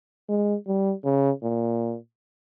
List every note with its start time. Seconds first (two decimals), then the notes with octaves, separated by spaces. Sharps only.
0.29 G#3
0.67 G3
1.05 C#3
1.43 A#2